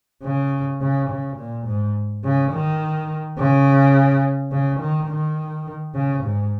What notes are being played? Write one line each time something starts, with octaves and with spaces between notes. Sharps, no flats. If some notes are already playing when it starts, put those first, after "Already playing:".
C#3
C#3
C#3
A#2
G#2
C#3
D#3
C#3
C#3
D#3
D#3
C#3
G#2